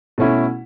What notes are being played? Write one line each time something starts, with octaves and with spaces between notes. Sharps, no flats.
B2 A3 C#4 E4